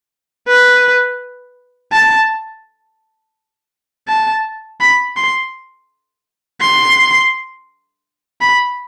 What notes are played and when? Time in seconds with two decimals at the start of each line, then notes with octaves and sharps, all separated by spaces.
0.48 B4
1.92 A5
4.08 A5
4.80 B5
5.16 C6
6.61 C6
8.41 B5